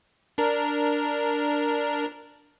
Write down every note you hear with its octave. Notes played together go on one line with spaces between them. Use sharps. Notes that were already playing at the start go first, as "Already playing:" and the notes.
D4 A#4